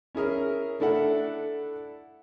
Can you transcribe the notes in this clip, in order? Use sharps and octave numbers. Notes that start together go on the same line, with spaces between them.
C#4 E4 G#4 A#4
A3 D4 E4 A4 F#5